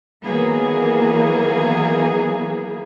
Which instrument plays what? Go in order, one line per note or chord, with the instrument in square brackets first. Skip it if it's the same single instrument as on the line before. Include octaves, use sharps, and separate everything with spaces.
[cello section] D#3 E3 F#3 A#3 B3 G#4